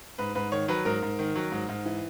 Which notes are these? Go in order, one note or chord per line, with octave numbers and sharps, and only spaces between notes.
G#2 B4
G#2 B4
D#3 C#5
F#3 B4
G#2 A#4
G#2
D#3
F#3
G#2
G#2
E3